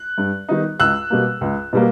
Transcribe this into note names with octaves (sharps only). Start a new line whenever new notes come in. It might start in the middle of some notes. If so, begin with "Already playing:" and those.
Already playing: F#6
G2
D#3 G3 B3 D#4
C#2 E6 F#6
B2 G3 A#3
C#2
B2 G3 A#3